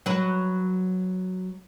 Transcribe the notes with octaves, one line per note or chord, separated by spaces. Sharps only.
F#3 B4